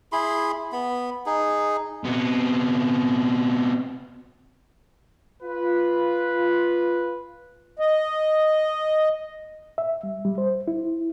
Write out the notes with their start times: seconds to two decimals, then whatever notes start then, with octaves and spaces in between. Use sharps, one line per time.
0.12 E4 G#4 B5 C6
0.72 B3 B5
1.26 D#4 G#4
2.04 C3 B3
5.43 F4 B4
7.79 D#5
9.78 E5
10.03 G3
10.25 G3
10.38 C5
10.68 E4